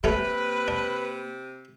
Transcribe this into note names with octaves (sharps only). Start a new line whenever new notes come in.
F#2 C3 A3 A#3 C#4 B4
D4